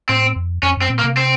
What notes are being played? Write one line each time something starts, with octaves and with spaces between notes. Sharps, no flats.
A2 C4
F2
F2 C#4
F#2 C4
A#2
A#3
C3
C4